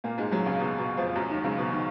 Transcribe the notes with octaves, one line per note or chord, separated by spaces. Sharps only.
A#2 A#3
G#2 G#3
F#2 F#3
C#2 C#3
B2
B2
F2 F3
F#2 F#3
D#2 D#3
C#2 C#3
B2
D#3